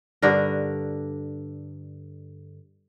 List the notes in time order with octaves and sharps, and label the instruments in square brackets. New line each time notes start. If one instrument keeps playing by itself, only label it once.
[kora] G2 D3 D4 A#4